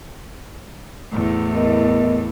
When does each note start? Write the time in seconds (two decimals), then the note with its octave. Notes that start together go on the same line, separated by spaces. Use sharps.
1.12 E2 A2
1.54 B3 A#4 D#5